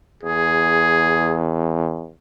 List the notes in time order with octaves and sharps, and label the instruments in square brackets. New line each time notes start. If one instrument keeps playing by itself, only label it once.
[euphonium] E2 [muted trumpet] G#4